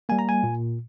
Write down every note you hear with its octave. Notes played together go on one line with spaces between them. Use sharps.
G3 A#3 G#5
A#5
G#5
A#2